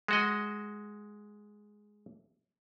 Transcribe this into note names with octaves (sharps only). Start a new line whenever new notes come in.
G#3 F#4 D#5